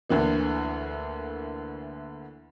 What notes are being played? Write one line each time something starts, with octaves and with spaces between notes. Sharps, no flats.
D2 D3 E3 A#3